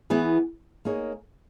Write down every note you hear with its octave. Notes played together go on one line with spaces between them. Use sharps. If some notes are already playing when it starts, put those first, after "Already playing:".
E3 B3 E4 G#4 B4
A#3 D#4 G#4 C#5